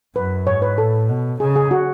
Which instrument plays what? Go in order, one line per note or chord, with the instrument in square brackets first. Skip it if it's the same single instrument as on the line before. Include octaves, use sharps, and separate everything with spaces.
[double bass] F#2 [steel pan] B4
[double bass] G#2 [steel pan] C#5
[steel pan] B4
[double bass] A2 [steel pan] A4
[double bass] B2
[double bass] C#3 [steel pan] G#4
[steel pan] G#4
F#4